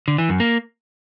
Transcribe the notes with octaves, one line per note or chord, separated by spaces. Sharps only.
D3
E3
F#2
A#3